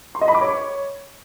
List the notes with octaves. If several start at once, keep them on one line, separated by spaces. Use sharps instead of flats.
C6
D#5
B5
D6
C#5